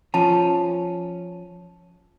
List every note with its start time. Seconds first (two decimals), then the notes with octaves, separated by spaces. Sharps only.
0.14 F3 C#4 A5